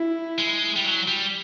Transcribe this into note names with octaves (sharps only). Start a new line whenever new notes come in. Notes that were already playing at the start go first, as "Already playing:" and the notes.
Already playing: E4
G#3
G3
F#3
G3